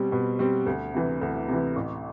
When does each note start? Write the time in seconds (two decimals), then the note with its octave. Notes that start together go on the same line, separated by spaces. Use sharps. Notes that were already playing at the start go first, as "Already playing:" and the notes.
Already playing: B2 G3 C4
0.12 B2
0.39 G3 C4
0.66 D2
0.94 C3 E3
1.21 D2
1.48 C3 E3
1.76 A1